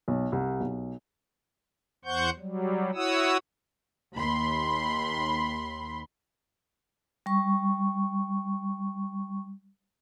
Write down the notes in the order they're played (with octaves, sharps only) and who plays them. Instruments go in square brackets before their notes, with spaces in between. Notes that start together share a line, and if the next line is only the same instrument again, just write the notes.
[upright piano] B1
C2
B1
[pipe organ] E2 C5 F#5 C#6 G6
F#3 G3
E4 F#4 C#5 F#5 D#6 E6
[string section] D#2 B5 C6
[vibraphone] G3 C#6